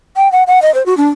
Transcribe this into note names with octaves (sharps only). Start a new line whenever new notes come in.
G5
F#5
F#5
D#5
C5
F#4
D4